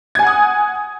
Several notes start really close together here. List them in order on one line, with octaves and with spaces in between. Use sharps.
G#6 G#5 F#5 D#6